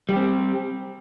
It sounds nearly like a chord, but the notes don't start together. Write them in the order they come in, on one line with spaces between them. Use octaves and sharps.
G3 G4 C4